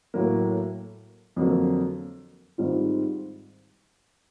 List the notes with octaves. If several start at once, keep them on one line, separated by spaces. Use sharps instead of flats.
A2 F#3 A#3
F2 D3 F#3 A#3
G#2 D#3 G3 C4 F4